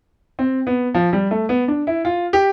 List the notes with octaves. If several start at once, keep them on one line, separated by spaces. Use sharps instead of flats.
C4
B3
F3
G3
A3
B3
D4
E4
F4
G4